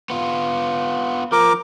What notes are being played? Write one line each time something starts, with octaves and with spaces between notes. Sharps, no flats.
B3 F4
F3 A#4 D6